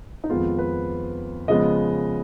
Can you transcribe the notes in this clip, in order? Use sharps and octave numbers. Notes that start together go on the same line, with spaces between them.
D#4
F2 D#3 G#3 B3 F4
B4
C#3 F3 G#3 B3 D#5